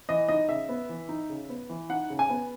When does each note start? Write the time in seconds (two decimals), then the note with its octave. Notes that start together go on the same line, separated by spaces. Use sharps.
0.09 E3 D#5
0.29 D#4 D#5
0.49 C#3 E5
0.69 B3
0.89 E3
1.09 D#4
1.30 C#3
1.49 B3
1.70 E3
1.90 D#4 F#5
2.10 C#3
2.19 G#5
2.30 B3